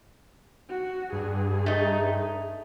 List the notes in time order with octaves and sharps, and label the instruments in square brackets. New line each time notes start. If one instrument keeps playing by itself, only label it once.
[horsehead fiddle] F#4
[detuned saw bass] G2 [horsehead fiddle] G#4
[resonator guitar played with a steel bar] A3 D#4